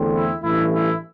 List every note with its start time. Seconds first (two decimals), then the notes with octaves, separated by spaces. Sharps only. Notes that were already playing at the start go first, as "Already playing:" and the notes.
Already playing: E2 D3 A3 C4
0.13 E4
0.42 A1 G2 E3 A3 E4
0.73 E4